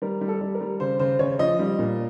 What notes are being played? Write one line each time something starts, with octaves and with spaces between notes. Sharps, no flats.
G3 A#4
G3
A4
G3
A#4
G3
C#3 C5
C#3 C5
C#3 C#5
F3 D#5
G3
A#2